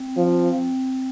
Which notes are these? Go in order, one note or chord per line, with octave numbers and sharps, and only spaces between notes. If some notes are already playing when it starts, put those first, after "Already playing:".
Already playing: C4
F3